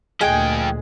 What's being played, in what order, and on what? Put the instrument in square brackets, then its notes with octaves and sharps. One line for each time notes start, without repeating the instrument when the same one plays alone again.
[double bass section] D2 A#2 [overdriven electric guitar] F3 G5 [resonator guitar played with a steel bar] G#3 G#4 D#5